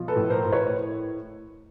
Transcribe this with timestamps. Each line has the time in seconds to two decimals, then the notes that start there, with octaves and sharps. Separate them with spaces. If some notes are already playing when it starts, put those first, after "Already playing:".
Already playing: B2 F3
0.08 A4 B4
0.16 A2
0.30 A#4 C5
0.45 A2
0.52 B4 C#5